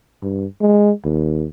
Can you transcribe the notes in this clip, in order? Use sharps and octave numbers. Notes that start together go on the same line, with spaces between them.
G2
G#3
D#2